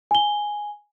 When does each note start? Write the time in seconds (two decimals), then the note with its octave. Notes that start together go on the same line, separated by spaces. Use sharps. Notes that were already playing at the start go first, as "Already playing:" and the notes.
0.11 G#5 G7